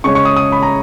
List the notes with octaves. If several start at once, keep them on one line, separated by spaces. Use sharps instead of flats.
C#3 G#3 C#4 C#6
C#6
D#6
D#6
B5
A#5